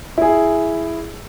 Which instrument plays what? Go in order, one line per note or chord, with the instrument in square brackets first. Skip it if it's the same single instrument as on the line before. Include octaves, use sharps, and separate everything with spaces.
[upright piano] E4 G#4